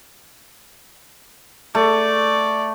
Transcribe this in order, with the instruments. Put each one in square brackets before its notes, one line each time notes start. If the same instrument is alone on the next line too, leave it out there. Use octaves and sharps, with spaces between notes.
[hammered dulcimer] A3 [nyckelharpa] D5